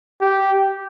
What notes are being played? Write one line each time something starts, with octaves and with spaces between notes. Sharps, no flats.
G4